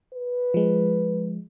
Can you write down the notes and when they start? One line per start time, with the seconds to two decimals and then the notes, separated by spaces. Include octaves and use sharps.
0.14 B4
0.54 F3 G#3